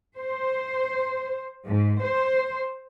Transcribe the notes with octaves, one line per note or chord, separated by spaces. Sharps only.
C5
G#2
C5